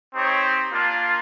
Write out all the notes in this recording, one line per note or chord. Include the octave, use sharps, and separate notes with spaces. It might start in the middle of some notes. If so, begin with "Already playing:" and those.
C4 D#4 G4 C#5
A#3 D4 F4